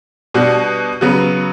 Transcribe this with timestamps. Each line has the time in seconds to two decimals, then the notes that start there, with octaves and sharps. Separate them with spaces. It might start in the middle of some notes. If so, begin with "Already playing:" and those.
0.34 B2 G3 D4 F#4
1.01 C#3 F#3 B3 F#4